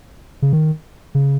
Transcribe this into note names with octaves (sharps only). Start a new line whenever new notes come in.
C#3
D#3
C#3